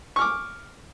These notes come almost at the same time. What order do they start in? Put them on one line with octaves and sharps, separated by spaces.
C#6 F6 D6